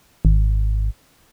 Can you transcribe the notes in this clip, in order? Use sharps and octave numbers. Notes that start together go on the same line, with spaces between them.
G#1